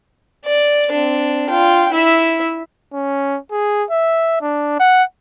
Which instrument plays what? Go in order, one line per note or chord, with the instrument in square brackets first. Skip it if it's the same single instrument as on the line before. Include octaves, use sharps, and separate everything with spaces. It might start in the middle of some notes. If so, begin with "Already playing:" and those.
[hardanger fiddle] D5
C4 D4
F4 G5
E4 E5
[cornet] C#4
G#4
E5
D4
F#5